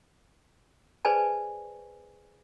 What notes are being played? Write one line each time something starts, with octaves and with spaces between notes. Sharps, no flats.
G#4 B4 C5 D5 G#5 A5